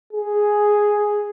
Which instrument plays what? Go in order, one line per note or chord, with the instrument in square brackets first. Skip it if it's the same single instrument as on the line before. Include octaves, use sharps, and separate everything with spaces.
[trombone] G#4